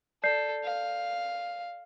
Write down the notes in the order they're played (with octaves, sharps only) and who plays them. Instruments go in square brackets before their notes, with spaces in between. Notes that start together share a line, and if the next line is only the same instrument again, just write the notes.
[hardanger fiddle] A4 [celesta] D5 G6 C7
[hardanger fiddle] F5